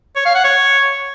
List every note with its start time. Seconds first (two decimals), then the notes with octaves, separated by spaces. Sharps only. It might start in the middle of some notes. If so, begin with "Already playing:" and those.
0.16 C#5
0.25 F5
0.35 F#5
0.44 C#5